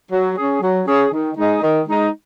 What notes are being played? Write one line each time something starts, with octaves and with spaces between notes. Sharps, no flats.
F#3
C#4 G#4
F#3
C#4 G#4
D#3
G#3 D#4
D#3
G#3 D#4